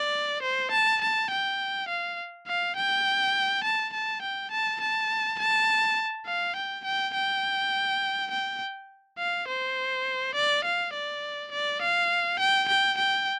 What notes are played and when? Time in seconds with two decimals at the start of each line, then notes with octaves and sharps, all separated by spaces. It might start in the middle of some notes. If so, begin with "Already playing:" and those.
Already playing: D5
0.42 C5
0.71 A5
1.01 A5
1.31 G5
1.88 F5
2.47 F5
2.76 G5
3.64 A5
3.93 A5
4.22 G5
4.51 A5
4.80 A5
5.39 A5
6.26 F5
6.56 G5
6.85 G5
7.14 G5
8.31 G5
9.18 F5
9.48 C5
10.35 D5
10.64 F5
10.94 D5
11.52 D5
11.82 F5
12.39 G5
12.68 G5
12.98 G5